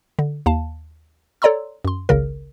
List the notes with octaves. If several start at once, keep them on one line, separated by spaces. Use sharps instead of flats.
D3
D#2 F5 A5
A4 C#5 D5 A#5 C6 E6
F#2 C6
G#1 C#2 C#3 A#4